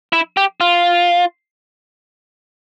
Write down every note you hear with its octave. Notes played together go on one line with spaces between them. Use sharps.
E4
G4
F4